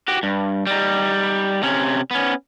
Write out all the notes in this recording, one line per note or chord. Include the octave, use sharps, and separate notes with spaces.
F#4 G4
G2
G3 D#4
C3 C#4
B3 C#4